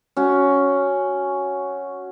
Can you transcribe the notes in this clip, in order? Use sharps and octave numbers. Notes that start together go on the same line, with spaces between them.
C#4 F#4